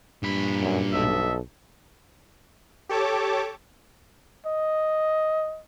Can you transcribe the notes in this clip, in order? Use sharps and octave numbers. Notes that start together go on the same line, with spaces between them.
G2 A#2 B5
F#2
B1 A4 D#5 E5
G4 A4 C#5 A5 D6
D#5